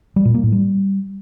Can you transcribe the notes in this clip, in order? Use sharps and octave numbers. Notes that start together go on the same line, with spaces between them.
G3
A#2
A#3
A2
G3